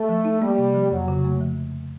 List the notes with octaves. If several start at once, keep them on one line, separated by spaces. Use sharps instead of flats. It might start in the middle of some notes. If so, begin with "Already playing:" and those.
Already playing: A3
F3
D#4
G3 A#3
C3
F3
F2 F#3
C#3
A3
F3